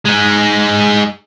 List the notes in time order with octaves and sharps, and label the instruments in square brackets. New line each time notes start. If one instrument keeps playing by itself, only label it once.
[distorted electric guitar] G#3 D#4